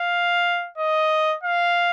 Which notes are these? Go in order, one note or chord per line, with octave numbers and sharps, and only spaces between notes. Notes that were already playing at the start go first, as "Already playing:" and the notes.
Already playing: F5
D#5
F5